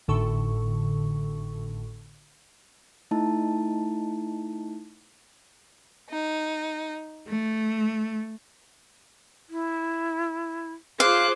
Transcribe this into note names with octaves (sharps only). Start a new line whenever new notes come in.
G#1 A2 D3 A4 C#6
A3 D#4 E4 A5
D#4
A3
E4
F4 G#4 C5 F5 D6 F#6